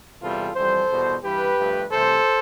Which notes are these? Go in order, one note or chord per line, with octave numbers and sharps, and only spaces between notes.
E2 C3 E3 G3 F4 A4
F2 E3 G3 A4 C5
E2 B2 G3
G2 E3 G3 G4 B4
G2 F3 A3
C2 C3 E3 A3 A4 C5